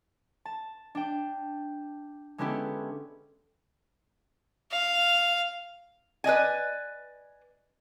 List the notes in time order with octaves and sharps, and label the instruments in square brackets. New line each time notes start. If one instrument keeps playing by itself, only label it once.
[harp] A5
D4 G5
D3 G#3 B3 C#4 E4 G4
[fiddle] F5
[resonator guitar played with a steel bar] B4 D5 D#5 G#5